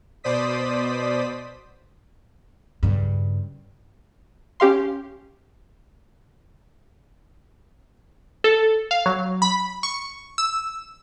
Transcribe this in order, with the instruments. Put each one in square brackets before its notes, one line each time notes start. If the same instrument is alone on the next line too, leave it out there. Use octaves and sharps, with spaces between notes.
[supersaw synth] B2 C5 D5 D#6 B6
[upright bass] G2 C#3
[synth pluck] C#4 G4 F5 C6
[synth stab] A4
F5
F#3
B5
C#6
E6